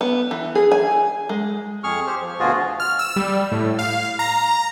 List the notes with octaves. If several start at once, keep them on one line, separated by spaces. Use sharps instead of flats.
B3
E3
G#4
G#5
G#3
F2 G#4 C#6 F6
G4 C5 F6
F3
D2 B2 F3 F4 F#4 G#4
F6
E6
G3
A2
F5
A#5